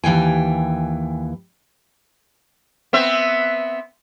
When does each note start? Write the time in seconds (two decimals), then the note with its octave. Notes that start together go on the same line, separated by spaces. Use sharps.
0.04 D#2 E3 G5 G#5
2.93 B3 C4 E5